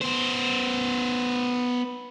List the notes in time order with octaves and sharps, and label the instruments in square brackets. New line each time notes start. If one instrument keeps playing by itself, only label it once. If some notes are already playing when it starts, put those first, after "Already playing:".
[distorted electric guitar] B3 C5